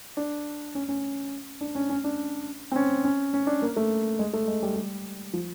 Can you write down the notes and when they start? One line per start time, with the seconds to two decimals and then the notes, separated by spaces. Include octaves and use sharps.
0.17 D4
0.75 C#4
0.89 C#4
1.61 D4
1.75 C#4
1.89 C#4
2.04 D4
2.72 C4
2.76 C#4
3.04 C#4
3.34 C#4
3.47 D4
3.62 A#3
3.76 A3
4.19 G#3
4.33 A3
4.48 G#3
4.63 G3
4.76 G3
5.34 F3